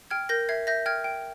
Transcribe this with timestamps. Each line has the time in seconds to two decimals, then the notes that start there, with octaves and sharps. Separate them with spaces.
0.11 G5 F6 G#6
0.29 A#4 G6 A#6
0.49 E5 G#6 C7
0.67 E5 G6 A#6
0.86 G5 F6 G#6
1.04 G5